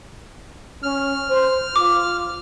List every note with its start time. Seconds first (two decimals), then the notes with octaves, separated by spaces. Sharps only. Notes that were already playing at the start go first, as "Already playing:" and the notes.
0.83 C#4 F6
1.28 C5
1.76 F4 D6